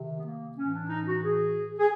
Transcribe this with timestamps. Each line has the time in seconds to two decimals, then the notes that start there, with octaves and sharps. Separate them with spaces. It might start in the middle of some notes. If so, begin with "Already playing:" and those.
Already playing: C3 D#3
0.17 B3
0.25 A#3
0.57 A2 E3 C#4
0.73 D4
0.89 D#4
1.05 F#4
1.22 G#4
1.79 G#4